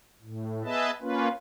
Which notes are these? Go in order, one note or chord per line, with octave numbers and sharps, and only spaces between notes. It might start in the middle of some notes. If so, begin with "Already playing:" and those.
A2
B3 G#4 B4 D#5 E5 A5
A#3 C#4 F4 B4